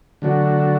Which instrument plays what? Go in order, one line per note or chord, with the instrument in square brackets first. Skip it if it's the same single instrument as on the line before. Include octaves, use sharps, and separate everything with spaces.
[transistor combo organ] D3 F#3 A3 D4 F#4